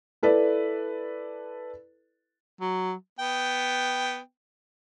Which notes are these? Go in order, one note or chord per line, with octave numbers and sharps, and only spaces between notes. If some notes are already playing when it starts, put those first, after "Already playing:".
E4 A4 B4 D5
F#3
B3 G5